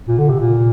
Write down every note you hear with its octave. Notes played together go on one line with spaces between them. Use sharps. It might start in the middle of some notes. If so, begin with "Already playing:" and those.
A#2
D3
C3
A#2